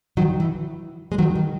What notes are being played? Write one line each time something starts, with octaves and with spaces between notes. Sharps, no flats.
D#3 F#3
E3
G#3
D#3 F#3
D#3